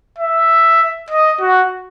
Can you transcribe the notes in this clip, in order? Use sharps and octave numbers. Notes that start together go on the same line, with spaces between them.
E5
D#5
F#4